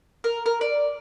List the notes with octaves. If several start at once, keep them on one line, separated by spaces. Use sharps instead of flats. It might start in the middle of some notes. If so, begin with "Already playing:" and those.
A#4
A#4
D5